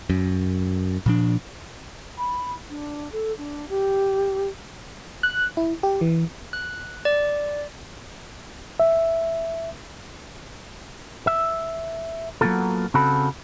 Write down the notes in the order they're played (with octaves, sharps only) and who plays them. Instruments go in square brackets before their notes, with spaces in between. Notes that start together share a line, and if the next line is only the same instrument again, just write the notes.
[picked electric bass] F#2
A#2 F3 D4
[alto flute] B5
D4
A4
D4
G4
[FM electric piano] F#6
E4
G4
E3
[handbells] F#6
D5
[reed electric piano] E5
[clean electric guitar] E5
F#3 G#3 A#3 B3 F4 A4
C#3 C4 F#4 A4 B5